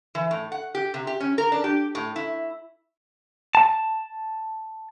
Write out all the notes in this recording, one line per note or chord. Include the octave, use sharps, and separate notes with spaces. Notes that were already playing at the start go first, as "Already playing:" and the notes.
E3
A2
F#5
G4
C3
G4
C#4
A#4
D4
G4
A2
E4
A5